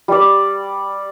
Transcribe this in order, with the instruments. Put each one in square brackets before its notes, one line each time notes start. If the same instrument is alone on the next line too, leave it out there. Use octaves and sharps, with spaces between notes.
[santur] G3 D5